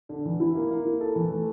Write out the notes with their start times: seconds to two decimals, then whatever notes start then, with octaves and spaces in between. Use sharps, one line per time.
0.09 D3
0.25 E3
0.40 E4
0.55 A#3
0.71 A#3
0.85 E4
1.01 A4
1.16 E3
1.31 A3